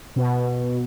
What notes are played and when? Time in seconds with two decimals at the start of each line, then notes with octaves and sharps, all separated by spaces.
0.16 B2